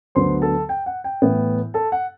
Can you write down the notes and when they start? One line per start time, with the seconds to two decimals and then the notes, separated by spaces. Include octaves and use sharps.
0.15 D2 D3 F#3 B3 C5 C6
0.42 A4 A5
0.69 G5
0.86 F#5
1.04 G5
1.22 A2 E3 B3 E4
1.74 A4 A5
1.92 F#5